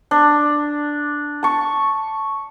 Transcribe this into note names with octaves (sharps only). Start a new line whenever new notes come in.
D4
A5 C#6